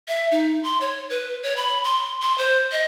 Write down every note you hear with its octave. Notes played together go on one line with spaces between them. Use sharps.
E5
D#4
C6
C#5
B4
C#5
B5
C6
C6
C5
D#5